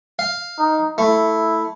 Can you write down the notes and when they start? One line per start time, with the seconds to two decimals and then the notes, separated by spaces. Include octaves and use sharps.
0.19 F5
0.58 D#4
0.98 A3 E4